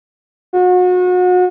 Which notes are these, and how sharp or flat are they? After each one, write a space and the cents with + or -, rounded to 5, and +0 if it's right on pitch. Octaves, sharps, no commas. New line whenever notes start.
F#4 -35